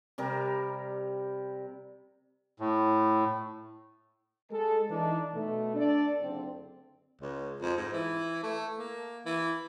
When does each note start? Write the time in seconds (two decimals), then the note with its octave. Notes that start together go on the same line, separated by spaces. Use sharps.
0.18 C3 G3 A#4
2.60 A2
4.51 G#3 A4
4.89 E3 D4 D#4
5.34 B2 A3
5.74 D4 A4 D5
6.20 F#1 D2 C4
7.21 C#2
7.62 F2
7.77 G#2
7.93 E3
8.43 A3
8.79 A#3
9.26 E3